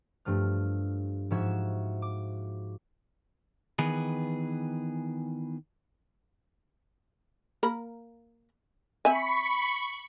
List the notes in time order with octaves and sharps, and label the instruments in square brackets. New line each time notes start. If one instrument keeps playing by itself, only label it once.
[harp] G2 F3 A3 F6
G#2 F3 F#4 E5 G#6 E7
D6
[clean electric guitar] D#3 E3 B3 G#4 B4
[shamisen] A#3 A#4 B5
[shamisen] C4 E5 G#5 [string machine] B5 C#6